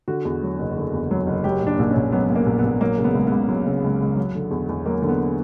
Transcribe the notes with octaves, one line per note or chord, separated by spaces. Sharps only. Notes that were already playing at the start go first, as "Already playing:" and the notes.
D3 F#4
E2
F#3
F#1
D3
E2
F#3
F#1
F#3 G4
A#2 D4
A#1 D4
C#4
A#1
F#3 B3
A#2
A#3
A#1
A#1 B3
F#3 A#3
C#3
B3
C#2
C#2 B3
F#3
C#3
C#2
C#2
F#3
D3
E2
E2
F#3 A#3
D3
B3